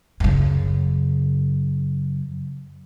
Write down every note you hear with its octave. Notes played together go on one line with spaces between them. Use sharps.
F#2 C#3